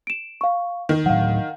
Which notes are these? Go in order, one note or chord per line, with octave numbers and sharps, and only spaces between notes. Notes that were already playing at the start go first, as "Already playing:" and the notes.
D7 E7
F5 C#6
D#3
A2 F#3 F5 F#5